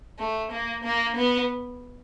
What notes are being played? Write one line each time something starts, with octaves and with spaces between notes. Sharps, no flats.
A3
A#3
A#3
B3